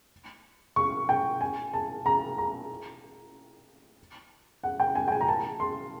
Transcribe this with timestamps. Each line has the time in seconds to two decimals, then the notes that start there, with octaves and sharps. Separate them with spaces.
0.76 C#6
1.09 G5
1.41 G#5
1.73 A5
2.06 A#5
2.38 A#5
4.64 F#5
4.80 G5
4.95 G#5
5.08 G5
5.12 G#5
5.21 A#5
5.28 A5
5.60 C6